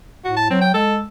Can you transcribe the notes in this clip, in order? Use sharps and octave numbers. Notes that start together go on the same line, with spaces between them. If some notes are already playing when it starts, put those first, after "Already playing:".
A2 F#4
A5
F#3 C4
G5
G#3 A4